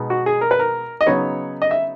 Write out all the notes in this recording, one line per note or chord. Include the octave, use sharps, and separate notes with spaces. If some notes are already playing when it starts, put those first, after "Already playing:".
Already playing: B2 G#3 B3 D#4
F#4
G#4
A#4
B4
A#4
D#5
C#3 F#3 B3 D#4 C#5
D#5
E5